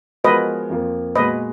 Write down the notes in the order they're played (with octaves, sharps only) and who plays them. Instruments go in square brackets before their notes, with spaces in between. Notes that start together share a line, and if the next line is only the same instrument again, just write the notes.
[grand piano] F3 G#3 B3 F#4 A#4 [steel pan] B4 D#5
[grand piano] F2 F3 A#3
[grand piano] A#2 G#3 B3 F#4 [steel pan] B4 D#5